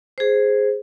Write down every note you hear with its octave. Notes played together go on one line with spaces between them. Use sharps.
G#4 C5